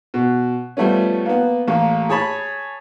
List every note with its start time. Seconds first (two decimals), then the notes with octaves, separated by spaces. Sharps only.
0.14 B2
0.77 F3 G3 A3 B3 C#4
1.26 A#3 B3
1.68 A1 A#3
2.09 G#4 C#5 A5 B5